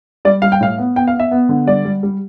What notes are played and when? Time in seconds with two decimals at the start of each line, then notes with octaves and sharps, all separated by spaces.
0.25 G3 D5
0.42 G3 F5
0.52 G5
0.61 A2 F5
0.78 B3
0.96 B3 G5
1.08 F5
1.14 B3
1.20 E5
1.31 B3
1.49 D3
1.67 G3 D5
1.85 G3
2.03 G3